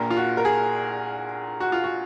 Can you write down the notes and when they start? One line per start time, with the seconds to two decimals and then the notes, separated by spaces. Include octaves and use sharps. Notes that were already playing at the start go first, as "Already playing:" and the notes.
Already playing: A#1 A#2 A#4
0.10 F4
0.17 F#4
0.37 A#4
0.45 G#4
1.60 F#4
1.72 F4
1.84 F#4